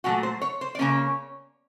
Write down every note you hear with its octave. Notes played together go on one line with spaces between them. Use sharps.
A#2 F#3 A3 F#4
C5
C#5
C5
D5
C#3 F#3 A#3 C#4 C#5